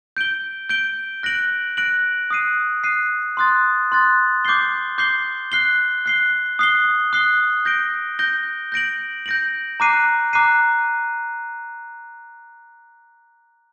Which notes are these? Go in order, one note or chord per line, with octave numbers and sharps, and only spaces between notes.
G6 D7 G7
G6 D7 G7
F#6 A#6 D7 F#7
F#6 A#6 D7 F#7
D#6 F#6 C7 D#7
D#6 F#6 C7 D#7
C6 D#6 F#6 A6
C6 D#6 F#6 A6
D6 G6 C7 G7
D6 G6 C7 G7
F#6 C7 G7
F#6 C7 G7
D#6 F#6 C7 G7
D#6 F#6 C7 G7
G6 A#6 D7 G7
G6 A#6 D7 G7
G6 A#6 D7 F#7
G6 A#6 D7 F#7
A#5 D6 F#6 C7 D#7
A#5 D6 F#6 C7 D#7